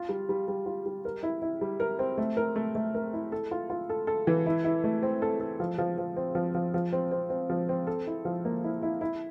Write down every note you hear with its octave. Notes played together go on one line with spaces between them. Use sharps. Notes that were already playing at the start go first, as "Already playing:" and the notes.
Already playing: F4
G3
G3
G3
F4
G3
A#4
E4
E4
G3
A#4
C4
A3
A#4
A3
A3
A#4
E4
A4
F4
F4
A4
A4
E3
E4
E4
A3
C4
A4
A4
F3
F3
F3
C4
F3
F3
F3
C4
C4
C4
F3
C4
A4
E4
F3
A#3
E4
E4
E4